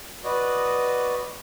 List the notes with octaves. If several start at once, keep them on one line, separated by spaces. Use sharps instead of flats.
F#4 B4 D5 D#5